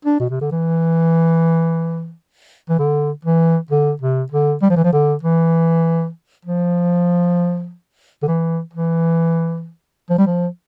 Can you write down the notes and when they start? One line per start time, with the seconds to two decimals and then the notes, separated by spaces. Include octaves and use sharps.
0.05 D4
0.20 B2
0.30 C3
0.41 D3
0.51 E3
2.69 E3
2.79 D3
3.25 E3
3.71 D3
4.02 C3
4.32 D3
4.62 G3
4.70 F3
4.76 E3
4.84 F3
4.93 D3
5.23 E3
6.45 F3
8.23 D3
8.28 E3
8.73 E3
10.10 F3
10.18 G3
10.27 F3